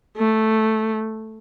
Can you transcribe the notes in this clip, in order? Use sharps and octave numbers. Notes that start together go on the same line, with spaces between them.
A3